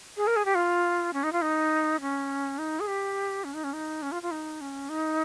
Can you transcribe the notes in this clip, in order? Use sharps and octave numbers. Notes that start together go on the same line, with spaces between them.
G#4
A#4
G#4
G4
F4
C#4
D#4
F4
D#4
C#4
D#4
G#4
G4
C#4
D#4
C#4
D#4
C#4
F4
F4
D#4
C#4
D#4